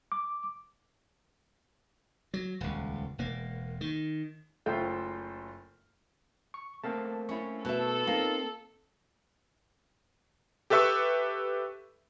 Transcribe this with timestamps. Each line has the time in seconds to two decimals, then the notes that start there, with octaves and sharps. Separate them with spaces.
0.12 D6
2.34 F#3
2.61 D#1 C#2
3.18 E1 A#3
3.81 D#3
4.66 F#1 A3 F4 C5 G5
6.54 C#6
6.84 A3 A#3 C4 A5
7.29 C#4 E4 C#6
7.65 B2 A4 E5
8.07 A#3 C4 D#4 F4
10.70 G4 A4 B4 E5 C#6 E6